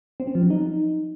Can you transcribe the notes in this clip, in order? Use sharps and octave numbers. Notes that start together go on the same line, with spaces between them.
C4
C#4
F3
F#3
D#4